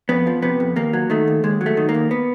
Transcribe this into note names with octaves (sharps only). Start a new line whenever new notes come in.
F2 B3
F3
C3 B3
F2
D#2 A#3
F#3
D#3 A3
D#2
D#2 G#3
F#3
A3
D#3
A#3
D#2
B3